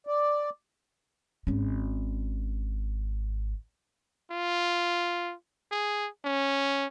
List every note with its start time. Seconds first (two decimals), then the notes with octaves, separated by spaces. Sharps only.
0.07 D5
1.47 G#1 C#4
4.31 F4
5.72 G#4
6.25 C#4